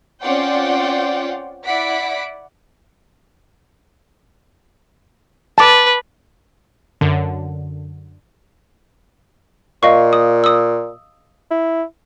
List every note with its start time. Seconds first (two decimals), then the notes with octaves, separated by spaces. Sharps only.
0.22 C4 C#4 F4 D5 F#5 G5
1.64 E4 D5 F#5 B6 D7
5.58 B4 A5 D6
7.01 F#2 D3
9.83 A#2 D#5 F5 C#6
10.13 D#6
10.44 D#6 E6
11.51 E4